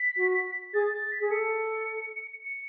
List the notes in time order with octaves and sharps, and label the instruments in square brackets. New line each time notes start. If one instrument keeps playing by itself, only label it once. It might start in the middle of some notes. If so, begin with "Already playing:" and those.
Already playing: [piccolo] B6
[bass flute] F#4
[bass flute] G#4 [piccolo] A6
[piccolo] A6
B6
[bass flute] G#4
[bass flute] A4 [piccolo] C#7
[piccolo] C#7